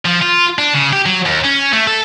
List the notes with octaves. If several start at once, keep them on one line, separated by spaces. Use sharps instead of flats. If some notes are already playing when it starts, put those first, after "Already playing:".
F3
F4
D4
C#3
G4
F#3
D#2
C#4
A3
A4